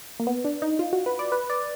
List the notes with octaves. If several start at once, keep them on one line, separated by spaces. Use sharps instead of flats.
A#3
B3
D4
D#4
F4
F#4
B4
D5
B4
D5